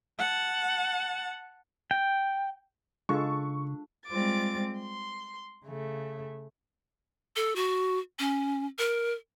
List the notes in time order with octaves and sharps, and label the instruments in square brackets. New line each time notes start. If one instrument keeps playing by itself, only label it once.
[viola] F#5 A5
[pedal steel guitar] G5
[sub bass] C#3 [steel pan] G#3 F4 A4 [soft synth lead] D4 [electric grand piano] C#6
[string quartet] G3 G#3 C4 F4 D6 A6
C6
C#3 A3
[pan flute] A4
F#4
C#4
A#4